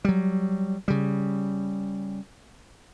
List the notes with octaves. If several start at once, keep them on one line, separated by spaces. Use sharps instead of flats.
F#3 G3
C#3 G3